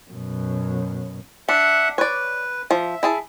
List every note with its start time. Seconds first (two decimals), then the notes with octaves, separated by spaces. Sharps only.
0.11 F#2 B2
1.49 D4 E5 F#5
1.98 B4 C#5 D5
2.71 F3 E5
3.03 E4 G#4 A5